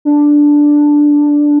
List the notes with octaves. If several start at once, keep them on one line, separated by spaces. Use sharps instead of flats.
D4